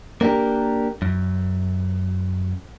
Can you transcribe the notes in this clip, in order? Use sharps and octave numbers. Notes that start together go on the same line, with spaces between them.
A#3 B3 D4 G4 A#4
F#2